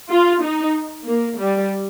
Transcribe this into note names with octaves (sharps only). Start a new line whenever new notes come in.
F4
D#4
A#3
G3